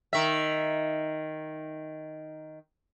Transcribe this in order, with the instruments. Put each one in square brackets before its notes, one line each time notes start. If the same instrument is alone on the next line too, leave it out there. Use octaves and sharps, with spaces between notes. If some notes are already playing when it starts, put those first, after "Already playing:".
[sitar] D#3 E5